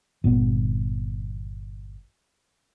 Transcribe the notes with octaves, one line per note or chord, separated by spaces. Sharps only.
G1 A#2 B3